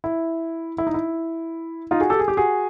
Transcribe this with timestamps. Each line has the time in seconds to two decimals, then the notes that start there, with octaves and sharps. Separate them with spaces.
0.04 E4
0.78 E4
0.87 D#4
0.94 E4
1.91 D#4 F4
2.00 F#4 G#4
2.10 G4 A4
2.19 G#4
2.28 G4
2.37 F#4 G#4